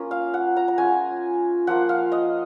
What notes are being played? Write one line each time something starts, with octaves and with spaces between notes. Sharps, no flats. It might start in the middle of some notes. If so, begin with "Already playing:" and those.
Already playing: A#3 C#4 F4
F5
F#5
A#5
A#5
G#3 C#4 F4 G#5
F3 A#3 F4 F#5
F5
D#5